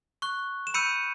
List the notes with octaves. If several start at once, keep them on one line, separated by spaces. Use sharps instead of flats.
C#6 F#6
E7
B5 E6 G6 C#7 D#7